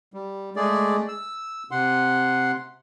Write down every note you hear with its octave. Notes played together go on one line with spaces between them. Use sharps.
G3
G#3 A3 G#4 D5
E6
C3 F#5 C6